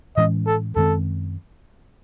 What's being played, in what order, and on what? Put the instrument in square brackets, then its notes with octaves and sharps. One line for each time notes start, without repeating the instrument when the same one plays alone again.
[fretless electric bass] A2 E3 G#3 C#4 [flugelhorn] D#5
[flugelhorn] A4
[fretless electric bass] F#2 D#3 G#3 C4 [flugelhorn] A4